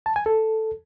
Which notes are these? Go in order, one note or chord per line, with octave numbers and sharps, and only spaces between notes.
A5
G#5
A4